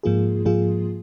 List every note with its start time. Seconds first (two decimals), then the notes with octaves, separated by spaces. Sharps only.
0.03 G#2 F3 A#3 F4 G#4
0.45 G#2 F3 A#3 F4 G#4